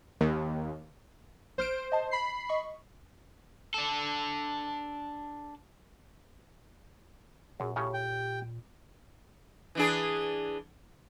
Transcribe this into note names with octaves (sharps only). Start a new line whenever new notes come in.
D#2
A#1 C5 F6 D7
D#5 A5
B5 C7
D#5 C#6
D4 A4
F#2 A#2 G#4
A2 C#3 C#4 G4
G5
E3 D4 G#4